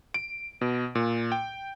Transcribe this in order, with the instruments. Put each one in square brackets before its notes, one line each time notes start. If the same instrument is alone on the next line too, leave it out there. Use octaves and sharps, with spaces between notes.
[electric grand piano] D7
B2
A#2
G5